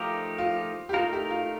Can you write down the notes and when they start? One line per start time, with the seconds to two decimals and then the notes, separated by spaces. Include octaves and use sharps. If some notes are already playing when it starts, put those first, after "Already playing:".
Already playing: F3 A3 D#4 F4 G4 A#4
0.38 F4
0.89 G4
0.93 A3 D#4 F4 A#4
1.13 G4
1.31 F4